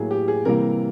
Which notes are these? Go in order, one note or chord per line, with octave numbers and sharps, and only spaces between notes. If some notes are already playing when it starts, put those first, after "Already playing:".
Already playing: A2 F#3 A#3 G#4
G4
G#4
C3 E3 G3 A#3 A#4